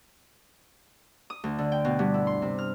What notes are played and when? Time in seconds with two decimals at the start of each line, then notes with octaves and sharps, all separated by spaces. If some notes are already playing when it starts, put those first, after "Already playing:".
1.30 D#6
1.44 D2
1.58 D3
1.72 G5
1.85 B2
1.99 G2
2.14 E4
2.27 C6
2.42 C3
2.59 F6